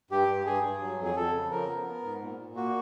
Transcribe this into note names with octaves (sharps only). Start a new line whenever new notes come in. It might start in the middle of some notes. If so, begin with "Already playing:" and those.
G2 G4
G2
G2 G#4
G2
F#3
F2
G#4
F2 A4
C#3
F3 A#4
B3
B3
G#2
A#2
A#2
A#3 F#4